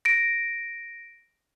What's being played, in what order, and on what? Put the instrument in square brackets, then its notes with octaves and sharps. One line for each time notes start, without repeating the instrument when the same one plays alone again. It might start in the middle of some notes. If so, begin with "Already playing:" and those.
[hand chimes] A#6 D7